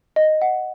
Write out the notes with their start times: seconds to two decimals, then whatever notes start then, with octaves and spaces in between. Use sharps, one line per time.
0.16 D#5
0.41 F#5